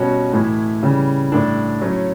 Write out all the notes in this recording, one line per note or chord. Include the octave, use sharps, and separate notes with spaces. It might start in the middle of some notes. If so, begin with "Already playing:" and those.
Already playing: B2 G3 C#4 F#4
A2 E3 A3 E4
C#3 E3 G3
A2 G3 D4 A4
F#3 A3 C#4 E4